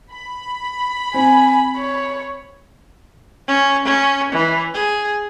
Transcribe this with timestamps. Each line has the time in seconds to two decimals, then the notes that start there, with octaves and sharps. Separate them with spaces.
0.11 B5
1.14 C4 G#5
1.77 C#5
3.48 C#4
3.85 C#4
4.32 E3
4.74 G#4